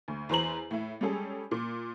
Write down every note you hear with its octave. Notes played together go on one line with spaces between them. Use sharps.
D2
E2 B4 C5 A#5 F#7
A2 E5
G3 G#3 C#4 G#4 A4
A#2